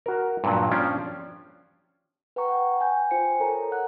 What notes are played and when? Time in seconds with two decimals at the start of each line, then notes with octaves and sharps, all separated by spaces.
0.06 F#4 A#4
0.44 G2 A#2 F#3
0.71 F3 C#4 D4 D5 F5 G5
2.36 B4 F#5 G5 A#5 C#6
2.48 F#5 G5
2.81 G#5 G6
3.11 F4 C5 G5 G#5 C#7
3.40 A4 A#4 C#5 A#5
3.72 F#5 F#6